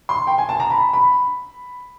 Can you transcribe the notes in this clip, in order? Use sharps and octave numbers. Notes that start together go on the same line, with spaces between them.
C6
G5
G#5
A5
A#5
B5
B5